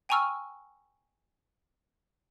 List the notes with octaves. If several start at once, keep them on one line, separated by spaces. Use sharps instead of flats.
G5 G#5 A#5 C#6 E6 F6